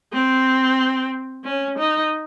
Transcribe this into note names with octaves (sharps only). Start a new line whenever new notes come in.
C4
C#4
D#4